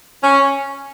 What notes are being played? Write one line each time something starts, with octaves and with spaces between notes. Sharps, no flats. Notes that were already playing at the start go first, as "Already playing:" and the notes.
C#4